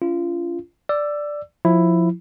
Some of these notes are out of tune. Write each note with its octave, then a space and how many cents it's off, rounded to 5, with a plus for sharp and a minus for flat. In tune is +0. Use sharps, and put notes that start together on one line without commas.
C#4 +30 F4 -25
D5 +0 E6 +20
F3 +15 E4 +5